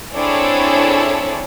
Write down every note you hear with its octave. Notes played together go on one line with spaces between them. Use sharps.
C4 D4 E4 G#4 A4 C#5